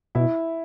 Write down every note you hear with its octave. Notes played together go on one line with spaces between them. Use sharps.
B2 E4